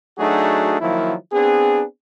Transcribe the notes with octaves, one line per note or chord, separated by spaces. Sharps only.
F#3 A3 D4 D#4 F#4 G#4
D#3 F3 F#3 A#3 E4
B3 C4 D4 G#4